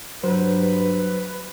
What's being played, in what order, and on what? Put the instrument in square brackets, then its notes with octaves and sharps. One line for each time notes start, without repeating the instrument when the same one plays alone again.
[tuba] G2 [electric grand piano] F#3 [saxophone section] B4 [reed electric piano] C5